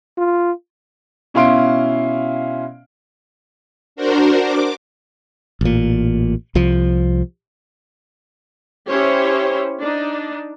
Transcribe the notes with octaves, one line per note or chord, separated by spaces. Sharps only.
F4
B2 C#4 E4 F5 C6 D7
D4 F#4 A#4 C5
D6
A1 A#2
C2 F3
C#4 E4 G4 C5 C#5
D4 D#4